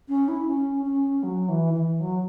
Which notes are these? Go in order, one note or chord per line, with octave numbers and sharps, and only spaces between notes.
C#4
E4
C#4
C#4
F#3
E3
E3
F#3